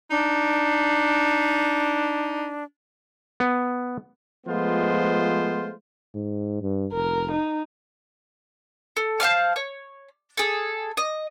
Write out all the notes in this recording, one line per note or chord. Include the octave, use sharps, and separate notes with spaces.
D4 D#4
B3
F3 G#3 A3 B3 F4 C5
G#2
G2
F1 A#4
D#4
A4
C5 F5 A5 F6
C#5
G#4 A4
D#5